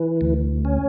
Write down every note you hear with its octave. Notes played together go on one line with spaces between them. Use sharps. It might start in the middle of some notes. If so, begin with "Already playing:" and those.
Already playing: E3
D2
C#4